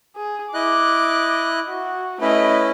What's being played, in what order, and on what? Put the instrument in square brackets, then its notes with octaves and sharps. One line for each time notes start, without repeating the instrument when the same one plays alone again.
[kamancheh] G#4
[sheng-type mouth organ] E4 D#5 F#6 [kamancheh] D6
[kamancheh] F#4
[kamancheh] A3 D#5 [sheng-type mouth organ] C#4 E4 B4